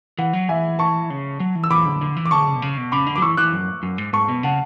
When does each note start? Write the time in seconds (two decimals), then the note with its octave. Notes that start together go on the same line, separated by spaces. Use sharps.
0.18 E3 F#5
0.33 F#3
0.49 E3 E5 G#5
0.79 A5 C#6
1.10 C#3
1.40 F#3
1.55 E3
1.64 E6
1.71 E3 B5 D6
1.86 D3
2.01 D3
2.17 E3
2.26 D6
2.31 D3 A5 C#6
2.47 C#3
2.55 B2
2.62 C#3
2.77 B2
2.92 C#3 B5 D6
3.07 D3
3.16 F#3 D6
3.22 E3 C#6 E6
3.37 E3 D6 F#6
3.52 F#2
3.83 F#2
3.98 G#2
4.13 G#2 A5 C#6
4.28 B2
4.43 C#3 F#5 A5